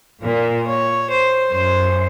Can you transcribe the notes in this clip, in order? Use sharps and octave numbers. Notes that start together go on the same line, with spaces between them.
A#2 A#4
C#5
C5
F#2 C5